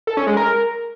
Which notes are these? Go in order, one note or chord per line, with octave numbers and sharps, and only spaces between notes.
A4
C#4
G#3
A#4